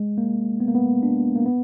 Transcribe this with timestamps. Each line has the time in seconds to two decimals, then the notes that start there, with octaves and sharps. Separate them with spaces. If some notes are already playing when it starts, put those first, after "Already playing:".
Already playing: G#3
0.18 A#3
0.60 B3
0.68 A#3
0.75 B3
1.03 D4
1.36 A#3
1.46 B3